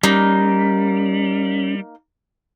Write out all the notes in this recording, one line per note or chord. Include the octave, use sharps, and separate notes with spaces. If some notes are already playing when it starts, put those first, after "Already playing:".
G3 A#3 C#4 D#4